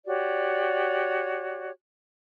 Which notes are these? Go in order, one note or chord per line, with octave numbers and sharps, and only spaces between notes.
F#4 G4 C#5 D5